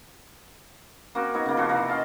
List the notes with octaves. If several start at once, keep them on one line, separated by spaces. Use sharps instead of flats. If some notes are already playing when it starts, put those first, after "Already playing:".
A#3 C4 C#4 F#4
B3 D#4 C#5
C#3 A#3
F3 C4 F#4
C3 E3 A#3 C4
C#4 D#5 F5 A5